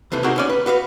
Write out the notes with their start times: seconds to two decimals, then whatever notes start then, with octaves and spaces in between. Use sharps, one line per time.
0.12 D#2 C3 E3 A3
0.24 C3 C4 D#4 F#4 G#4 A#4
0.36 D#2 C#4 D5
0.50 B4
0.66 F#4 B4 E5 F5